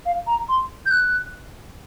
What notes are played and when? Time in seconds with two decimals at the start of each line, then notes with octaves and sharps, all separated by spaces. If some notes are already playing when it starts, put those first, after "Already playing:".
0.05 F5
0.27 A#5
0.49 C6
0.86 G6
0.91 F#6